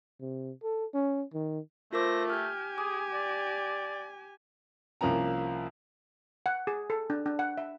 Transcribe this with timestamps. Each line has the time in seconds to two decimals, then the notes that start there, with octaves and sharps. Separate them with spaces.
0.21 C3
0.63 A4
0.94 C#4
1.34 D#3
1.93 A3 F4 A#4 C5 D6 A#6
2.30 G4 G#5 F6 G6
2.78 G#4 D6
3.14 D5
5.01 C2 F3 A#3 C#4 A#5
6.46 F#5
6.67 G#4
6.90 A4
7.10 D4
7.26 D4
7.39 F#5
7.58 E5